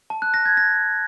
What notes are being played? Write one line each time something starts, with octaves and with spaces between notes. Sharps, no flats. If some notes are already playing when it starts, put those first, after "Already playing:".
A5
F#6
A#6
G#6
A#6